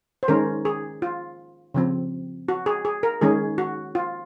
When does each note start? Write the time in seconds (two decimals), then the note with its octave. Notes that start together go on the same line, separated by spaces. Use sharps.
0.23 C5
0.28 D#3 G#3 C#4 A#4
0.65 G#4
1.02 F4
1.74 C#3 F3 C4
2.48 F#4
2.66 G#4
2.85 G#4
3.03 A#4
3.21 D#3 G#3 C#4 G#4
3.58 F#4
3.95 F4